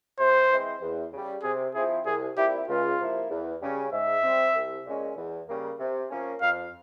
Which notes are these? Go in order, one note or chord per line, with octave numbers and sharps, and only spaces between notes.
C3 C5
E3 G#3 C4 E4
E2
C#3 G3
C3 G#4
F3 C4 E4 G#4
C2 G#4
A#2 G3 C4 E4 G4
C#2 F4
C3 F3 A#3 E4
E2
C#3 G3 C#4
G#2 E5
G3 C4
C2
A#2 G#3 C#4
E2
C#3 G3 A#3
C3
F3 A#3 C#4
F2 F5